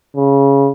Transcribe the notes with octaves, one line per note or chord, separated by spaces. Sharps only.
C#3